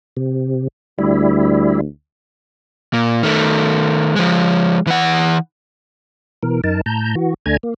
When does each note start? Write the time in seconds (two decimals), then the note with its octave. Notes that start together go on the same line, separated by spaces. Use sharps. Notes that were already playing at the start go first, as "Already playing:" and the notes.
0.17 C3
0.99 D2 G3 E4
2.93 A#2
3.23 D#3 A3
4.16 F3 G#3
4.87 E3 F#5
6.43 B2 E3 A#4
6.64 F#2 D#4 A#4 A5
6.86 A2 A5 A#5 G6
7.15 E3 F#4
7.46 D2 A3 D4 G#5 A#5 G#6
7.63 A#3